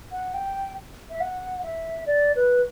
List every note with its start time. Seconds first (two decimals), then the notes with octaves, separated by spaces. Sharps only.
0.12 F#5
0.34 G5
1.10 E5
1.20 F#5
1.63 E5
2.06 D5
2.35 B4